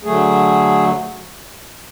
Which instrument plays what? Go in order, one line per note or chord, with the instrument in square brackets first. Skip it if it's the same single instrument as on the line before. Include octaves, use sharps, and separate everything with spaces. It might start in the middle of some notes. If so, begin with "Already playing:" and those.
[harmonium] D3 F#3 A3 G#4